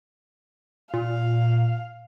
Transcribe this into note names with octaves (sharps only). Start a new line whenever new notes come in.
A#2 F5